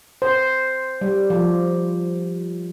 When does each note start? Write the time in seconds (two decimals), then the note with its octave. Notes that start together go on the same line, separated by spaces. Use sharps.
0.22 C5
1.01 G3
1.30 F3